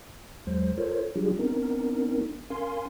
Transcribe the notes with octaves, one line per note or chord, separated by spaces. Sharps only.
E2 F#3 G#3 C5
F4 A4 A#4 C5 C#5
F#3 G3 D4 F4 G4 G#4
B3 C4 D4 D#4 A#4
C#4 A#4 F5 G#5 C6